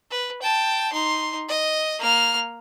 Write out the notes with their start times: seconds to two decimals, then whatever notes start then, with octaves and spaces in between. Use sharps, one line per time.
0.11 B4
0.42 G5 A5
0.93 D#4 C6
1.49 D#5
1.99 A#3 F6